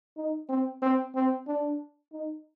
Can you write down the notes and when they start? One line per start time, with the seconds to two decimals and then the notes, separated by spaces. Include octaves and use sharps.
0.17 D#4
0.49 C4
0.82 C4
1.15 C4
1.47 D4
2.13 D#4